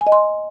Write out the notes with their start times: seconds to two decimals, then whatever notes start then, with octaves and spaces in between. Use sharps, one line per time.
0.01 G#5
0.07 D#5
0.12 C6